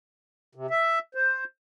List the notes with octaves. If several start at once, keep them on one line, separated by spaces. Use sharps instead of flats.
C3
E5
C5